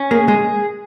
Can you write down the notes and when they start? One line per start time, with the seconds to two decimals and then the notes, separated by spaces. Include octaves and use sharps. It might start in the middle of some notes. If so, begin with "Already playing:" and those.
Already playing: C#4
0.11 A#3 G#4
0.28 G#3 G#4